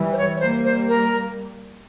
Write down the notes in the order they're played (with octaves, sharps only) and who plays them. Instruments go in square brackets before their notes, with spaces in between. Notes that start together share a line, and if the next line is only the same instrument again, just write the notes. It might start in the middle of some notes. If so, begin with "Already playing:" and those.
Already playing: [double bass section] E3 G3
[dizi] C5
C#5
C#5
[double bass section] G3 A#3 [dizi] C5
[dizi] C5
A#4